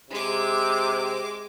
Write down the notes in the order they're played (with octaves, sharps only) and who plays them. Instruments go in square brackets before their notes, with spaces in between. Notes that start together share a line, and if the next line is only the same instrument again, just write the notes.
[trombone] C3 [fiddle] G#3 D6